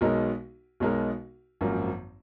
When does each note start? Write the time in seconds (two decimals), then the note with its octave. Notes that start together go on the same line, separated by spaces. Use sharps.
0.01 B1 B2 G#3 D#4 A#4
0.80 B1 B2 G#3 D#4 A#4
1.61 G#1 F#2 F3 A#3